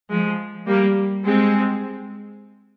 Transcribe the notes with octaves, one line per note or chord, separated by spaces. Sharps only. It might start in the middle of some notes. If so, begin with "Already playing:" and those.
F3 G#3
G3 A#3
G#3 C4